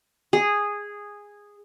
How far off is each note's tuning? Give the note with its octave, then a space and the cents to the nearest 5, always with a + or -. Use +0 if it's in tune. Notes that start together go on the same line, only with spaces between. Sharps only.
G#4 -10